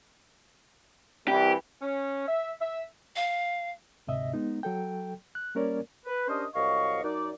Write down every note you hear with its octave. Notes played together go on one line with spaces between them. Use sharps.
C2 E3 G4
C#4
E5
E5
F5
D2 G#2 C3 D#5 E5
G#3 B3 D#4
F#3 A4 G5
F#6
G3 A#3 C#4 A#4 C#5 D5
B4
C#4 D4 G4 A#4 C5 D#5
C2 F#3 D#5 F5 C#6
F#2 D#4 D5